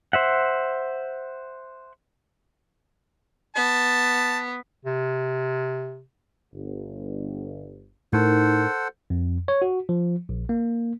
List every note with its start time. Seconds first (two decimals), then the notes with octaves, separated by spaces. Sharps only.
0.13 C5 E5 F#5
3.56 B3 A5
4.85 C3
6.53 G1
8.13 A2 D#4 A4 A#4 C5 F#5
9.10 F2
9.48 C#5
9.62 F#4
9.89 F3
10.29 A#1
10.49 A#3